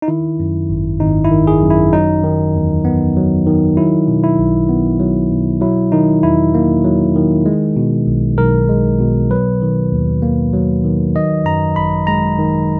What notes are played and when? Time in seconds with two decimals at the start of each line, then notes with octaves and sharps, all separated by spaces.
0.02 D#4
0.08 D#3 E4
0.40 F#2
0.70 G#1
1.00 G#1 D#4
1.24 E4
1.31 D#3
1.47 G#4
1.62 F#2
1.70 E4
1.93 F#3 D#4
2.24 D#3
2.55 E2
2.85 B3
3.16 F#3
3.46 D#3
3.77 F#3 E4
4.07 B2
4.24 E4
4.39 B1
4.69 B3
5.00 F#3
5.32 B2
5.61 F#3 E4
5.92 D#3 D#4
6.23 E2 E4
6.54 A#3
6.84 F#3
7.16 D#3
7.46 G#3
7.77 B2
8.07 B1
8.38 B1 A#4
8.69 G#3
9.00 B2
9.31 F#3 B4
9.62 D#3
9.92 D#2
10.22 A#3
10.53 F#3
10.84 D#3
11.15 D#3 D#5
11.45 F#2 A#5
11.76 G#1 B5
12.07 G#3 A#5
12.38 D#3